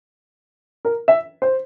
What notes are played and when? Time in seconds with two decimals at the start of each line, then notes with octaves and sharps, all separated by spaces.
0.85 A#4
1.08 E5
1.42 C5